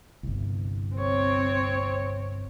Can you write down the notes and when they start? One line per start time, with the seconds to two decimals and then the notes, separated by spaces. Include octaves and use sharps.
0.23 G1 C2
0.95 C4 C#5